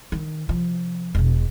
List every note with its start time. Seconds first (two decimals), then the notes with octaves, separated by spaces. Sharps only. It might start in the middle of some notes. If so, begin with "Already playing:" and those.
0.12 D#3
0.49 C3 F3
1.15 E1 B2